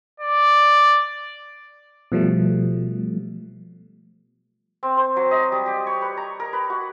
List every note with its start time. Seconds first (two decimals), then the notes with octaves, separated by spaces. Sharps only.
0.20 D5
2.12 B2 F3 G3 A3
4.83 C4
4.97 C5
5.16 F#3
5.31 D#5
5.52 G3
5.66 G4
5.87 C#5
6.02 B4
6.17 A#5
6.40 A#4
6.53 B4
6.70 F#4